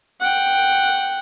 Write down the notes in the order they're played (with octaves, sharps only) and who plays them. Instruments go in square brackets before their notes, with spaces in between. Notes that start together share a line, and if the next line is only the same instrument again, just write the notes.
[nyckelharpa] F#5 G5